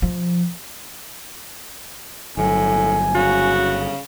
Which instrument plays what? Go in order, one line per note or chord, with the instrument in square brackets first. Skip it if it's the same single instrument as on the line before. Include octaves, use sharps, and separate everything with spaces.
[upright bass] F3
[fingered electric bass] G1 F#3 [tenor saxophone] A2 [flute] G#5
[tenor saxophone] C#3 [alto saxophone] F#4